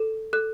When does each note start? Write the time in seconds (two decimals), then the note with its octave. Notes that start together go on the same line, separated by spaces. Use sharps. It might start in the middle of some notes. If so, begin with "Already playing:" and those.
Already playing: A4
0.33 A4 F#6